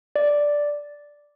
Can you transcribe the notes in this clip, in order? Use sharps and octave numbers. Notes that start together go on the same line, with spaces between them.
D5